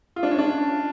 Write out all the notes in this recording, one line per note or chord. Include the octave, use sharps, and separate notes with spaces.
F4
D4
C#4
D4